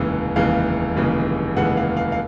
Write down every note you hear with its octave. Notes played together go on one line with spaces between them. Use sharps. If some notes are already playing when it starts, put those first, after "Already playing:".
Already playing: F1 D#2 C#3 E3 G#3
F1 D#2 C#3 E3 G#3 F5
F1 D#2 C#3 E3 G#3
F1 D#2 C#3 E3 G#3 F#5
F5
F5
F5